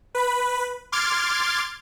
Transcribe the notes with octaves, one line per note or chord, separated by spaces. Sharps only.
B4 B5
C6 D6 F6 G#6 A6 D7